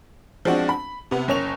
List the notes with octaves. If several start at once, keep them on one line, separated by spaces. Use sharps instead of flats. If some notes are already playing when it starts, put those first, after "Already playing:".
F3 G#3 C4 D4 F#4
B5
C3 B3
F#1 C#4 C#6 F7